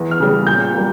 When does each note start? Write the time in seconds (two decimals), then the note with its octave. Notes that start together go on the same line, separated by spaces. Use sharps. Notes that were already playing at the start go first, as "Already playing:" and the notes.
Already playing: E2
0.11 F6
0.20 C#3 G3
0.47 A#2 G6
0.74 G3 A#3